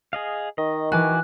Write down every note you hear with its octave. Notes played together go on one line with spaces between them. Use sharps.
G#4 D#5 F5
D#3 D#5
E3 F#4 G#5 D6 F#6